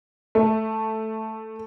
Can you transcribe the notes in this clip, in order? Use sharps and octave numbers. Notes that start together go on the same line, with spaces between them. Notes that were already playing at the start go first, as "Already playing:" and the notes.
A3